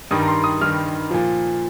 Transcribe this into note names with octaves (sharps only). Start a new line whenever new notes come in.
G2 D#3 G3 D#6
A#5
C6
D#6
G2 D#3 G3 F6
A#2 F3